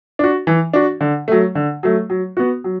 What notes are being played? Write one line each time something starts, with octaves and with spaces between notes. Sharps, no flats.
D4 F#4
E3
D4 F#4
D3
F#3 A3
D3
F#3 A3
F#3
B3 F#4
F#3